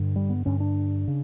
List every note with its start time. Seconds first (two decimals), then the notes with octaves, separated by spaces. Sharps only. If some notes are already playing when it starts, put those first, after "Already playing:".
Already playing: G2 D3
0.16 G3
0.30 B3
0.45 G2 D3 C#4
0.60 D4
1.08 C#3